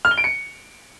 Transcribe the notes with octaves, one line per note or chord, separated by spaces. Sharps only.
F6
G7
D7
C#7